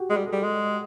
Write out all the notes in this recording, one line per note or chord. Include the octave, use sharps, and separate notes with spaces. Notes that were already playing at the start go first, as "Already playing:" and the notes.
Already playing: F#4 G4
G#3 G#4
G3
G#4
A4
G3
G#3